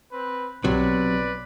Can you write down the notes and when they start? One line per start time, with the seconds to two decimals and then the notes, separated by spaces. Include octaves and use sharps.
0.12 C4 B4
0.64 B1 C3 F#3 B4 D5